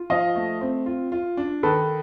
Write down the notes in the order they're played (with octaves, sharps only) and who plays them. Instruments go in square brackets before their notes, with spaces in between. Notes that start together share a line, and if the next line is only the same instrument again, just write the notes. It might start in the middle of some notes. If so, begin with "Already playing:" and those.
Already playing: [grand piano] F4
[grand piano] F3 [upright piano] D#5 F5
[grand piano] A3
C4
F4
F4
D4
[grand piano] D#3 [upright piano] A4 B4